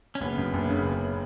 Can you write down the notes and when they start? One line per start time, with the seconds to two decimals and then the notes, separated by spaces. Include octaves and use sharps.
0.15 C#4
0.21 F#1 B3
0.38 F#2
0.54 F#1
0.70 C#3
0.86 F#1